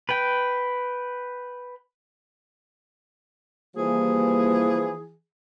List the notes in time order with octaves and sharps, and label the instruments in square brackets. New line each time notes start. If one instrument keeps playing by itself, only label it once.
[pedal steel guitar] B4 G5
[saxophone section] E3 G#4 [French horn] F3 [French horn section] G3 A#3